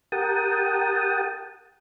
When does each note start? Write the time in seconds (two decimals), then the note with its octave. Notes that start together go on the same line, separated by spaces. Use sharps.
0.12 G4 A#4 F#5 G5 A5 D#6